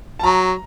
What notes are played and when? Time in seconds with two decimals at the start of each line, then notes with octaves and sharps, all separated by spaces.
0.19 A5
0.23 F#3 A#5